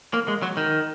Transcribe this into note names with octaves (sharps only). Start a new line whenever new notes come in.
A#3
G#3
F#3
D#3